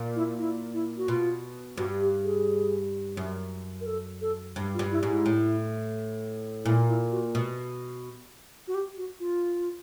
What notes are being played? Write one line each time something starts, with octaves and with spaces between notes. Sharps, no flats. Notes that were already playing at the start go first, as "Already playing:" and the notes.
Already playing: A#2
E4
E4
E4
F#4
B2 F4
G2 F#4
G4
G#4
F#2
A#4
A4
A4
G2
F4
G2
E4
G#2
E4
A2
A#2 E4
E4
F#4
B2
F#4
G4
F#4
F4